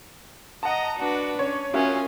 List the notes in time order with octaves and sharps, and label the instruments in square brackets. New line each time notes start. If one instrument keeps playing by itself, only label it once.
[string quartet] D#5 A#5 D#6 [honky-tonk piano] F#5 A5
[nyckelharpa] D4 [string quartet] F#4 B4
[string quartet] C#4 [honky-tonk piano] C#5
[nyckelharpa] C#4 [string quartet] F4 G#5 D#6 [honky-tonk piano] F#4 A#4 E5